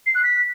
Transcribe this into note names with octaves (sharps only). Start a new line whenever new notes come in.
C7
F#6
B6